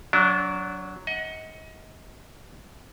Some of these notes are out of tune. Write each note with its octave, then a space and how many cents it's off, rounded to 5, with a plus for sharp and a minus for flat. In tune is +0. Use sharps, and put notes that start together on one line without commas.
F#3 +0 D4 -30
D#5 +30 F#5 +0